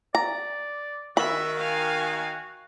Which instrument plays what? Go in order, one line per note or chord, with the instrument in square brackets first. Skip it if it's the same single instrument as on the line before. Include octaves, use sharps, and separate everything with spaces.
[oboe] D5 [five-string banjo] A#5
[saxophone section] D#3 [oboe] F#4 [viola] E5 [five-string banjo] B5
[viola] F5 G#5